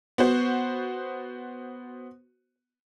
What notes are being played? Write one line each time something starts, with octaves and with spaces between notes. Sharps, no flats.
B3 F#4 C5